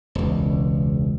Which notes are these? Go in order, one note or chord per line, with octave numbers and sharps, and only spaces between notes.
E1 C#2